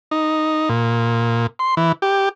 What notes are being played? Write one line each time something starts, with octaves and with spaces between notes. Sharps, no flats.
D#4
A#2
C6
E3
G4